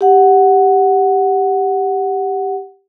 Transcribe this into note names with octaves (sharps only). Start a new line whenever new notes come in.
G4 F#5